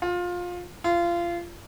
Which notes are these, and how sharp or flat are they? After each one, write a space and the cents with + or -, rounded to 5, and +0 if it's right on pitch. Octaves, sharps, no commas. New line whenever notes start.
F4 +20
F4 -25